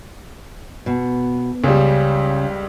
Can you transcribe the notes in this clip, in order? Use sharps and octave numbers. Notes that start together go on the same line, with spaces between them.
B2
C#2 C#3 G3